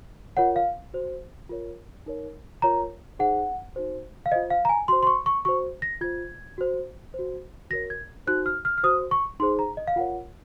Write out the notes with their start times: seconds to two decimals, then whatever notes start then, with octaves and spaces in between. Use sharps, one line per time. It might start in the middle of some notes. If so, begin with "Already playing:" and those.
0.37 F4 A#4 C#5 F#5
0.56 F5
0.94 F#4 C5
1.49 F4 A#4 C#5
2.06 D#4 A#4 C#5
2.62 F4 A#4 C#5 A#5
3.19 D#4 G#4 C5 F#5
3.76 D#4 F#4 C5
4.26 F5
4.32 F4 C5 D#5
4.50 F5
4.65 A#5
4.69 G#5
4.88 F#4 C5 C6
5.03 C6
5.07 C#6
5.26 C#6
5.45 F#4 C5 C#6
5.82 A#6
6.01 F4 C5 G#6
6.58 F#4 C5
7.14 F#4 C5
7.70 F#4 A#4 C#5 A#6
7.90 G#6
8.27 D#4 F#4 C5 F#6
8.46 F6
8.65 F6
8.78 F6
8.84 F#4 C5 D#6
9.11 C#6
9.40 D#4 G#4 C5 C6
9.59 A#5
9.77 D#5
9.87 F5
9.96 F4 A#4 C#5 F#5